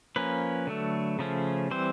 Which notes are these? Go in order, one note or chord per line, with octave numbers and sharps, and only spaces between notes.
F3 A#3 C#4 B4
D3 F#3 A3
C#3 F3 A3 C#4
E3 G3 C4 C5